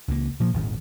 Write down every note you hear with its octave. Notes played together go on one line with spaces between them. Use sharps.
C#2 A#3
A#2 F3 A#3
D#1 G#1 D#3